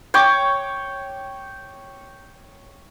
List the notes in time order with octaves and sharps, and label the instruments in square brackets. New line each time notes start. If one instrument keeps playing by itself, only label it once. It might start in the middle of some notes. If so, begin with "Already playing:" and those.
[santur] C#5 G5 D6